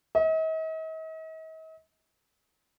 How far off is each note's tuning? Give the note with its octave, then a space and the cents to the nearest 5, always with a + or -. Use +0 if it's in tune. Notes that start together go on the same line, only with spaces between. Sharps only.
D#5 +45